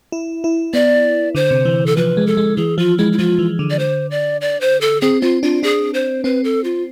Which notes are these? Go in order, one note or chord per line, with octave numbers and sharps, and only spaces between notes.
E4
E4
B3 D5
D3 C5
C3
E3
A4
F3 B4
G#3
A4
G#3
E3 G#4
F3 F4
G#3 E4
E4
F3 F4
E3
D3
D5
C5
D5
D5
C5
A4
C4 G#4
C4 F4
D4 F4
D4 G#4
C5
C4 B4
A4
F4